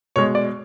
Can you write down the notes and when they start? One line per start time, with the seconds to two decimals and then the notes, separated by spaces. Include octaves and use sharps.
0.16 B2 G#3 C#5
0.35 D5